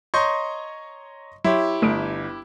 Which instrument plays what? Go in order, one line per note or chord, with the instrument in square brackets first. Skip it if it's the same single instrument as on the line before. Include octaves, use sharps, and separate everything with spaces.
[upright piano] C#5 A#5 [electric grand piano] D#5 C6 C#6 [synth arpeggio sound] G6
[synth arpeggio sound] F#3 [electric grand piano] E4 G4 [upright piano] C#5 E5 C6
[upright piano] G1 [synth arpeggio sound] A3 D#6 D7